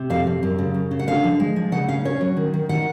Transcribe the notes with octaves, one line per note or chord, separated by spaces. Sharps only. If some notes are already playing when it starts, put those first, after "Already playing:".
Already playing: C3
F2 F5
F2
F#2
C#3
F#2
C#3
F#5
D3 F5
F3
G#3
F3
C#3 F#5
C#4 F5
C#4 C#5
F#3
D#3
D#3
D#3 F#5